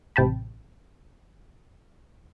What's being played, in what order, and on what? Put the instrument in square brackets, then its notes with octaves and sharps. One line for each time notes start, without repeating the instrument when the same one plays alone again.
[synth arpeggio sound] A1 C3 G5 A5 B5